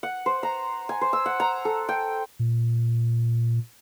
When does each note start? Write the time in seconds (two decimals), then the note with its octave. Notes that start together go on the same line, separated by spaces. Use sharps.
0.03 F#5
0.26 C5
0.43 A#5
0.89 G#5
1.01 C5
1.13 E6
1.26 F#5
1.40 A#5
1.65 A4
1.89 G5
2.39 A#2